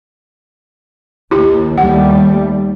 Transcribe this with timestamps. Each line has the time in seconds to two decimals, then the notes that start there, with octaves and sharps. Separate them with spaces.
1.31 D#2 E4 G4
1.78 D#2 G3 A3 F#5